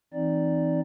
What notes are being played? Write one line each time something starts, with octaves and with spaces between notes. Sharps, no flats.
E3 C4 D#4 D5